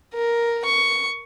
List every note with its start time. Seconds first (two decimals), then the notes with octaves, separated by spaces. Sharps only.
0.14 A#4
0.65 C#6